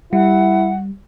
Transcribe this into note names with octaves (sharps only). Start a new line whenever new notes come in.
G3 E4 F#5